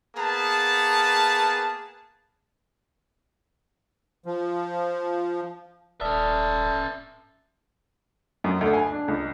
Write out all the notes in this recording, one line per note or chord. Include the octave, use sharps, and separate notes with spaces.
A#3 B3 G#4 A5
F3
D#1 C#4 A4 D5 E5 D#6 F6
F#2
D2
G#5
D4
C#2